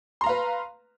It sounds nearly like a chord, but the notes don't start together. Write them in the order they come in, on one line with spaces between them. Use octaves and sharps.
C6 A#5 F5 B4